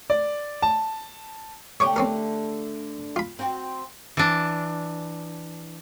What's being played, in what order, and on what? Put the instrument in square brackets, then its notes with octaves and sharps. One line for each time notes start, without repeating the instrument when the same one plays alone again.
[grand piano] D5
A5
[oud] D3 A3 G4 [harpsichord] C#5 C#6 D6
[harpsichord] C4 C#4 A#4
F4 B5
[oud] C4 F#4
[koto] E3 D4